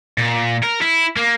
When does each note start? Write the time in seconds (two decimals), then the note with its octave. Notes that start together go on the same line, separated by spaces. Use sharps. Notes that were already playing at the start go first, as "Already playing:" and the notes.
0.18 A#2
0.63 A#4
0.82 E4
1.16 A#3